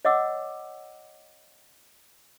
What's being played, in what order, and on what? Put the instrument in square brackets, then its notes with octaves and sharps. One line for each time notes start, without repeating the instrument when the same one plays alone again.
[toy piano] C#5 D#5 F#5 D6 E6